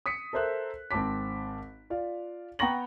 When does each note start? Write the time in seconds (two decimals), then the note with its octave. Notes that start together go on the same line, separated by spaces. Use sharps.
0.06 D#6 B6 C#7
0.33 A4 A#4 C5 E5 F#6
0.91 G#1 C4 A5 D6 B6
1.90 F4 D5 F5
2.59 B3 G5 A#5 C#6 A#6 F#7